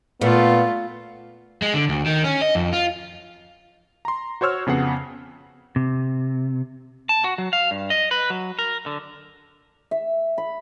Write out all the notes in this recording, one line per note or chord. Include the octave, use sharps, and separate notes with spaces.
A#2 A3 B3 F4
G#3
D3
D2
D#3
C#4
D#5
F2
F4
A#5 C6
F#4 C5 C#5 E6 F6
F2 C#3 B3 F#5 C7
C3
A5
F#4
F#3
F5
G2
D#5
B4
F#3
A#4
D3
E5
B5